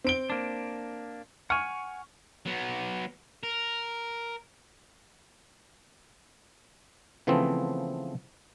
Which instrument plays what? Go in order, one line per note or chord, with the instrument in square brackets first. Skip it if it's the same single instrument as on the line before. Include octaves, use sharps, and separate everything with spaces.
[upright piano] C4 D7 G7
[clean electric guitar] A#3 D4
[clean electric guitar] F#5 G#5 [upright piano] C#6 F6
[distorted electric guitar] F#3 B3
A#4
[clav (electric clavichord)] C#3 E3 F3 A3 B3 C4